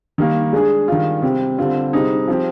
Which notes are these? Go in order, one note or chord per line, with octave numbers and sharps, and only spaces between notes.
D#3 G3 A#3
G#3 D4 G#4
D#3 G3 D4 F4
C3 G3 C4 G4
D3 G3 C4 F4
C3 G3 C4 D#4 G#4
F3 C4 G4